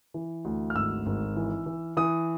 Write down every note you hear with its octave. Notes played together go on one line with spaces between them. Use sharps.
E3
D2
F6
G#1 E6
G#1
E3
E3
E3 D#6